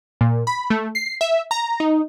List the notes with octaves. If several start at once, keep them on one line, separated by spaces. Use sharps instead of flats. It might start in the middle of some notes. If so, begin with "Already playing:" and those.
A#2
B5
A3
C7
E5
A#5
D#4